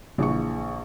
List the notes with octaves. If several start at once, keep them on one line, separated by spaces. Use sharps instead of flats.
A#1 C#3 E3 C#6